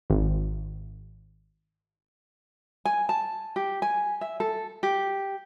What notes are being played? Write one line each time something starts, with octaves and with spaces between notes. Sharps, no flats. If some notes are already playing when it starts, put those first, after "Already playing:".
G#1
G#5
A5
G4
G#5
E5
A4
G4